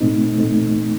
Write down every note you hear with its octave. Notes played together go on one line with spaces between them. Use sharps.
A#2 A3 C4 D#4
A#2 A3 C4 D#4